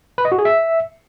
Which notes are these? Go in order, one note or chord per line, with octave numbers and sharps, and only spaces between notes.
B4
D#5
F#4
G#4
E5